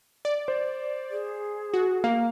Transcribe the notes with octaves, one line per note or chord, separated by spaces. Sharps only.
D5
C5
G#4
F#4
A#3 F5